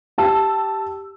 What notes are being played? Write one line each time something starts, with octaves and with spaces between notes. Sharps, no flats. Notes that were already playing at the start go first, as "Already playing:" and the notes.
G4 A5 E6